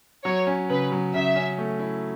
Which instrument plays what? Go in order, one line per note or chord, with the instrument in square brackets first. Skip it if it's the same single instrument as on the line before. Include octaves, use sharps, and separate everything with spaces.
[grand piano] F#3 [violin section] C#5
[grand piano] C#4
[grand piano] C#3 [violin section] B4
[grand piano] F#3
[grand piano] C#3 [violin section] E5
[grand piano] C#4
A3
E4